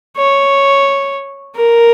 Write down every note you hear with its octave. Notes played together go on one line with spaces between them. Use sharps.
C#5
A#4